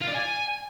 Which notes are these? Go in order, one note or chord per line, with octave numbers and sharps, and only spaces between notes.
F4
D5
G#5